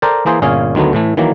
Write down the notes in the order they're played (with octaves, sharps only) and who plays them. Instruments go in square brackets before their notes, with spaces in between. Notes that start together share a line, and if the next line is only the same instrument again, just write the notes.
[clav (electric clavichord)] A4 A#4 C5 D5 G5 A5
E3 A#3 G#4 C5
G1 A#2 C#4 G#4 F5
D2 D#3 F#3 A3 B3
A2 E3 A3
D#3 E3 F#3 A#3